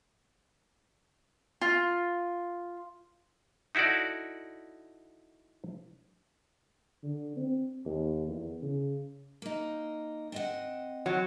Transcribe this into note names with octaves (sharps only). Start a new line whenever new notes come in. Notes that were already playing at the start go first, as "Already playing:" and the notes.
F4
D#4 E4 F#4 A4 D5
D3
C4
D#2
E2
C#3
A#3 D#4
C4 D#5 F#5
F#3